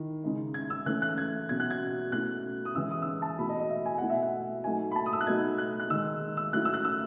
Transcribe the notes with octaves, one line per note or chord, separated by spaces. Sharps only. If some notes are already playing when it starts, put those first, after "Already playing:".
Already playing: D#3 E4
C#3 G#3 D#4
G#6
E6
E3 A3 C#4 F#6
F#6
G#6
B2 F#3 C#4 G#6
F#6
G#6
B2 A3 C#4 E4 F#6
D#6
E3 G#3 C#4 E4 E6
D#6
E6
D#6
A5
B2 A3 E4 B5
D#5
D#5
E5
G#5
B2 A3 E4 F#5
E5
F#5
F#3 A3 D#4 G#5
B5
A5
D#6
E6
F#6
B2 F#3 A3 D#4 G#6
F#6
F#6
D#3 G#3 D#4 E6
E6
F#3 A3 C#4 E4 F#6
E6
F#6
E6